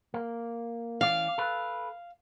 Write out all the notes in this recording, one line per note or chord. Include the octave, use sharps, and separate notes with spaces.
A#3
E3 C#4 D5 F5
A4 B4